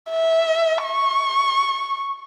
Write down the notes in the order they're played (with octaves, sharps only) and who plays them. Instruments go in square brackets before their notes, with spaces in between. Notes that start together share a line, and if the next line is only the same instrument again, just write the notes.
[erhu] E5
C#6